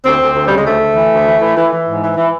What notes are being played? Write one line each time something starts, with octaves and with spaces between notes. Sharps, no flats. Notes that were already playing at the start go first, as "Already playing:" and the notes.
D2 C4
D2
D2
C#3 G3
G#3
D2 A3
D2
E3
D2
E3
E3
E3
E3
G#2
E3
E3